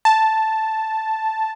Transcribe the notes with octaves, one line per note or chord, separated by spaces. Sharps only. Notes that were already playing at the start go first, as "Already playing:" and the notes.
A5